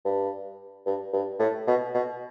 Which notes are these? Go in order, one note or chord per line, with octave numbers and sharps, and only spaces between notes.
G2
G2
G2
A2
B2
B2